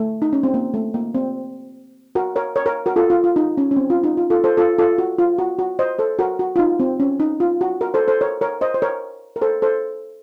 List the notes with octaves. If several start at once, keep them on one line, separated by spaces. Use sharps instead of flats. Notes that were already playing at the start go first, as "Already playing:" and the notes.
Already playing: A3
D#4
C#4
C4
A#3
A3
A#3
C4
F#4 A#4
A#4 C#5
A#4 C#5
A#4 C#5
F#4 A#4
F4 A4
F4
F4
D#4
C#4
C#4
C4
F4
D#4
F4
F4 A4
A4 C5
F4 A4
F4 A4
F#4
F4
F#4
F#4
C5 D#5
A4 C5
F#4 A#4
F#4
F4
D#4
C4
C#4
D#4
F4
F#4
F#4 A#4
A4 C5
A4 C5
A#4 C#5
A#4 C#5
C5 D#5
C5
A#4 C#5
A#4
A4 C5
A4 C5